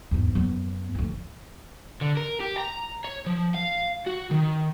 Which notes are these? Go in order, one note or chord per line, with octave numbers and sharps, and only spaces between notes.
E2 G#2
F#2 B3
D2 F3
D3
A#4
G4
A#5
C#5
F3
F5
F#4
D#3